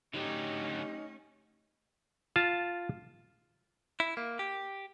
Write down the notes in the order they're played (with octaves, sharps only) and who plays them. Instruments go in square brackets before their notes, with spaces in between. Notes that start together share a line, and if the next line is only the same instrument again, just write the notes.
[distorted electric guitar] D3 F#3 [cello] A3 C#4 [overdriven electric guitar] D#4 [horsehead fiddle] G4
[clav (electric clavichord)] F4 A5
[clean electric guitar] E4
A#3
G4